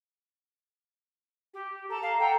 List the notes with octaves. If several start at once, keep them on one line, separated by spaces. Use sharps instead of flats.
G4
A4 A5 A#5
F5
A4 F#5 G5 A#5